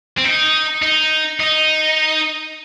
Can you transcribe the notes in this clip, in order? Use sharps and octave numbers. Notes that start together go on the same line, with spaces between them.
C4
D#4
D#4
D#4